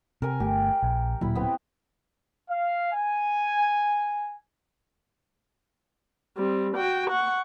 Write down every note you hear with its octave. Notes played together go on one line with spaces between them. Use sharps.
C3 A#4 G#5
G1 A3 G4
A#1
D1 A#2 F#3 E4 B5
B3 C4 B4
F5
G#5
G3 C4
F#4 G5
F#5 C#6